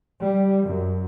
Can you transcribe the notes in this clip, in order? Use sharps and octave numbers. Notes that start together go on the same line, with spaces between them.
G3
F#2